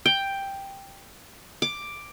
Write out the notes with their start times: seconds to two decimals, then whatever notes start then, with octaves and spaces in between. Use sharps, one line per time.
0.06 G5
1.62 D6